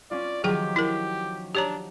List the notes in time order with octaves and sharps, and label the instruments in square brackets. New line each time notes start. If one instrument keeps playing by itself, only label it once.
[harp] C#4 F4 [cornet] D5
[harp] D#3 F3 F#3 [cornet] G4 [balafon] G#4 G5
[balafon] E4 A#4
[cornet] D4 [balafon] G4 C#5 A#5